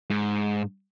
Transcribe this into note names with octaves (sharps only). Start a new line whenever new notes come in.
G#2